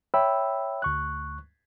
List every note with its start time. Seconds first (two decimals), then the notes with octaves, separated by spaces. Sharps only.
0.14 C#5 E5 G5 B5 E6
0.82 D2 C#6 F#6